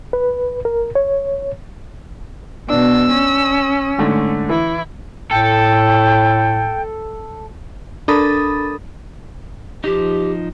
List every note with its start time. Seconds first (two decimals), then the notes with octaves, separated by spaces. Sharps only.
0.13 B4
0.65 A#4
0.95 C#5
2.70 B2 D4 E6
3.12 C#4
3.98 G#2 D3 A3
4.49 E3 E4
5.31 A2 A4 G5
8.08 D4 A4 A#4 B5 D#6 A6
9.84 F3 D#4 G4